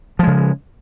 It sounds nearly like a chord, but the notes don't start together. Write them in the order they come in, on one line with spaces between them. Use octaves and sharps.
F3 G#3 C#3